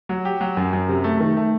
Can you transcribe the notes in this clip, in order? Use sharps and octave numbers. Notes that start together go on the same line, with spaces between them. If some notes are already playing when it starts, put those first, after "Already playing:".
F#3
G4
F#3
F#2
F#2
C3
A3
D#3
A3